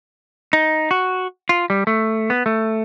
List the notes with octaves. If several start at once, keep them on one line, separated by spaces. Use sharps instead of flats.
D#4
F#4
F4
G3
A3
B3
A3